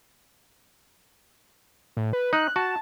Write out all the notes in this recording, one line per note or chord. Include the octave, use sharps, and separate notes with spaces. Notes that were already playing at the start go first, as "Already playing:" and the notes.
A2
B4
D#4 F#6
F#4 A5